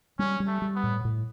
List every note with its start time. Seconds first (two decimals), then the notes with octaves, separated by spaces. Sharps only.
0.19 G3 C#4
0.40 G3
0.47 A3
0.62 G3
0.76 B3
0.83 A2
1.05 A2